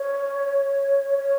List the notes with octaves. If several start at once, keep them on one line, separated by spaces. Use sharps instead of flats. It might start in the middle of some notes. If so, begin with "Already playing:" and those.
Already playing: C#5
C#5